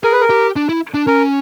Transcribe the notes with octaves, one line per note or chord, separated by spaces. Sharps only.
G#4 A#4
B4
A#4
G4
D4
E4
D4
C#4 A#4